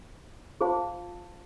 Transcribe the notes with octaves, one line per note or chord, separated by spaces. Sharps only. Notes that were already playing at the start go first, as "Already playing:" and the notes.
F4 G#4 C5 F5 A5